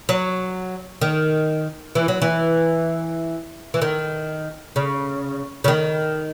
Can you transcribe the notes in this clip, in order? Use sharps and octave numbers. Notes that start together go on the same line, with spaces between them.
F#3
D#3
E3
F#3
E3
E3
D#3
C#3
C#3
D#3